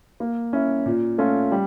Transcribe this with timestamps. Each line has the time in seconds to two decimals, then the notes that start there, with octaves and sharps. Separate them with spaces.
0.20 A#3
0.53 C#4 E4
0.86 A#2
1.18 A3 C#4 F4
1.52 G3